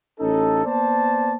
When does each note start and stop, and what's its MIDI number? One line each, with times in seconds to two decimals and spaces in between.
0.20 0.61 33
0.20 0.61 61
0.20 0.61 63
0.20 0.61 69
0.65 1.37 58
0.65 1.37 59
0.65 1.37 72
0.65 1.37 74
0.65 1.37 81